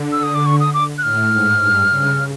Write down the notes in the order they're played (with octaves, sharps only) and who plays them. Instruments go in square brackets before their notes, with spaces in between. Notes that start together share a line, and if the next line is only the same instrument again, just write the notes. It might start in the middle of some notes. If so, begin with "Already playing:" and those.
Already playing: [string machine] D3
[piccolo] E6
D#6
D6
C#6
D#6
D6
F#6
[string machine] A2 [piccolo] F6
[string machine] G#2
G2
C#3